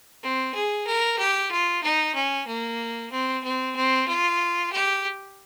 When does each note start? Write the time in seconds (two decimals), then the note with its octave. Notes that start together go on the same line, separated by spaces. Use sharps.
0.23 C4
0.54 G#4
0.87 A#4
1.19 G4
1.51 F4
1.83 D#4
2.15 C#4
2.47 A#3
3.11 C4
3.44 C4
3.76 C4
4.08 F4
4.72 G4